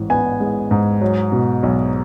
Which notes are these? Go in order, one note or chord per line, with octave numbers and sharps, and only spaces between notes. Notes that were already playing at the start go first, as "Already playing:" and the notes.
Already playing: A1 G#2
B3 G#5
G#3
G#2
F#3
B2
B1